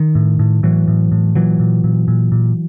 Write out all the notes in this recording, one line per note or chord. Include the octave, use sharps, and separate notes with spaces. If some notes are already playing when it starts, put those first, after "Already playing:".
Already playing: D#3
A2
A2
A2 E3 F#3
A2
A2
A#2 E3 F#3
A#2
A#2
A#2
A#2